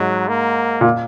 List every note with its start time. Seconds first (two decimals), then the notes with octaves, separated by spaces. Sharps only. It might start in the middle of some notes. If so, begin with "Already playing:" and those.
Already playing: G#2 F#3
0.28 A#3
0.81 A#2